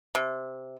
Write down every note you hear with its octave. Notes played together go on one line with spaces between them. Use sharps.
C3